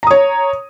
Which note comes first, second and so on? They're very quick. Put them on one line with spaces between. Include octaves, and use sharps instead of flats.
A#5 D#6 C#5